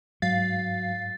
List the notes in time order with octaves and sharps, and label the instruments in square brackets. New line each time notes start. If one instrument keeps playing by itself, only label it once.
[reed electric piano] G#2 [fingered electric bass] F#3 [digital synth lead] F5 [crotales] A6